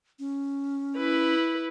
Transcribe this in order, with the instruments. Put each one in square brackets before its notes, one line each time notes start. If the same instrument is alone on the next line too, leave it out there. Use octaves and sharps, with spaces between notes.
[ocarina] C#4
[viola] E4 B4